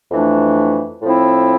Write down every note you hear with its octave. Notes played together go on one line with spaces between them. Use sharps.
F2 E3 A3 D4
A2 F3 C4 E4